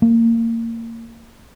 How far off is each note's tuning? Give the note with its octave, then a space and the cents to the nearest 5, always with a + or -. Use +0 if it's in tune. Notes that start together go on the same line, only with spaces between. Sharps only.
A#3 -25